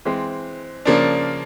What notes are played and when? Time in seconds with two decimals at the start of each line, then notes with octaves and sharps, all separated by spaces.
0.05 E3 G#3 C4
0.85 C#3 F3 A#3 D4